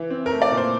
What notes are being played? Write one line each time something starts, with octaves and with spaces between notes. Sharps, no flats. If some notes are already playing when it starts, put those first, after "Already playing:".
Already playing: E3
C4
A3 A#4
D5
A#2
C5